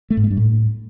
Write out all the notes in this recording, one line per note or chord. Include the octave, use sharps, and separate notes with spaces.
A3
G#2
A3
G2
A2